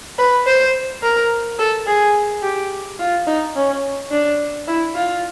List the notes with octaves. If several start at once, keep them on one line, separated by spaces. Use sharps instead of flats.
B4
C5
A#4
A4
G#4
G4
F4
D#4
C#4
D4
E4
F4